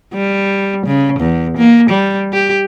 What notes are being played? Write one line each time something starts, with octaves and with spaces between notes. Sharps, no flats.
G3
C#3
E2
A#3
G3
G4